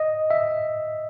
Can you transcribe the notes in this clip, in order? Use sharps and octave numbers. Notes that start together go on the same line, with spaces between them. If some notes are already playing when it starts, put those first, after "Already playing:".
Already playing: D#5
E5